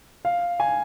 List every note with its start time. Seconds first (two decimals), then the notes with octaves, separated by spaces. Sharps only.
0.25 F5
0.60 G#5